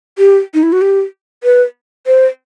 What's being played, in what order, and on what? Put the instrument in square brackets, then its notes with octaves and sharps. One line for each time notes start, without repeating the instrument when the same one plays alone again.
[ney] G4
D#4
E4
F#4
G4
B4
C5